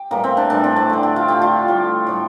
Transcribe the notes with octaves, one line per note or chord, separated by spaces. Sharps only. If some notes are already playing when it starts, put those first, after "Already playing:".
Already playing: G4
A2 E3 G3 A#3
C4
D4
A2 E3 G3 D4
C4
A3
D3 A3
G4
F4
D3 A3 G4
F4
A2 G3
A2 G3